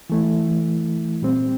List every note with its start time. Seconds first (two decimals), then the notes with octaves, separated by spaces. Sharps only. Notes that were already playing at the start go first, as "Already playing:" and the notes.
0.10 E3 A3 E4
1.22 A#2 G3 C4